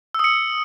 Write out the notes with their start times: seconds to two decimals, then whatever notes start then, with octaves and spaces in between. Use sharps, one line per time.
0.14 E6
0.19 D#6
0.24 C#7